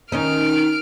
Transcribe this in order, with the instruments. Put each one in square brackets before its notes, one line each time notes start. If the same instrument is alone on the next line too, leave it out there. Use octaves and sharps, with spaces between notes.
[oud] D#3 C#4 D#4 [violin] F6 D7